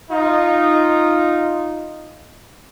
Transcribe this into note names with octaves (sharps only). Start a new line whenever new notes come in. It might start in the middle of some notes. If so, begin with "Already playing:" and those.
D#4 F4